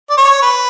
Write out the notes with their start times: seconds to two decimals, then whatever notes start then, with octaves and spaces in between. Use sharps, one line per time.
0.10 D5
0.18 C#5
0.42 B4